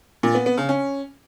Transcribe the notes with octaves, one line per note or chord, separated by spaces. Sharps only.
A#2
B3
B3
C#3
C#4